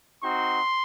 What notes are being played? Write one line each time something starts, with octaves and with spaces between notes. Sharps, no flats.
C4 D#4 F#4 C6